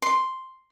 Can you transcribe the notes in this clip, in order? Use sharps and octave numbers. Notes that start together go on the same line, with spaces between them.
C6